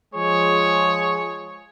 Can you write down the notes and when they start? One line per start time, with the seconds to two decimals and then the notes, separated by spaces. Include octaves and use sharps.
0.14 F3 G#3 G#4 C#5